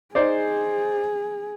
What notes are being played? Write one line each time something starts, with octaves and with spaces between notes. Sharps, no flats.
D#4 G#4 C5 D5